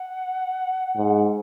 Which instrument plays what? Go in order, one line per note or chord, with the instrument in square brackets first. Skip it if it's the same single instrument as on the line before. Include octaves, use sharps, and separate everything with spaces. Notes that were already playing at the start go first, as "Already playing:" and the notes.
Already playing: [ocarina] F#5
[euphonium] G#2